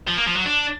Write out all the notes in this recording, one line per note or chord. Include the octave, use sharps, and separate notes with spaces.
F3
A#3
F3
F#3
D4